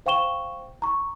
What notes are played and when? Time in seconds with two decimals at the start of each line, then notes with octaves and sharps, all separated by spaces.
0.06 C5 F5 G5 C#6 E7 G7
0.82 A#5 C#6